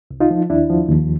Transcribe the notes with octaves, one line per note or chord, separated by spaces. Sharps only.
C2
D#4 F4
F3
D#2 D4 E4
F3
D#2